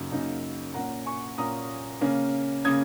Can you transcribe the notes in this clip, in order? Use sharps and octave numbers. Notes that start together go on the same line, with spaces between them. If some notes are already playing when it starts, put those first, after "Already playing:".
Already playing: F#2 C#3 A#3 D#4
F#2 C#3 A#3 D#4
A#2 A#3 C#4 F#5 A#5
G#5 C#6
A#2 A#3 C#4 A#5 D#6
C#3 A#3 C#4
C#3 A#3 C#4 D#6 G#6